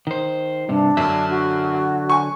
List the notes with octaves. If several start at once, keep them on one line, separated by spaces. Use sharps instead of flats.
D#3 C5
G2 C3 D4
F#2 D3 F#3 E5
F#4
G#5 C#6